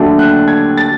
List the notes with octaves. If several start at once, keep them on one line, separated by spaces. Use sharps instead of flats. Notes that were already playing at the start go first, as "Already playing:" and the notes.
Already playing: D#2 D3 F#3 A3 D4
F#6
G#6
A6